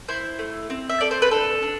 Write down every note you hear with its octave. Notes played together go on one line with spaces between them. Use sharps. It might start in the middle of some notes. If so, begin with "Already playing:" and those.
E4 C5
A3
C4
E5
A4 D5
C5
B4
D4 A4
D4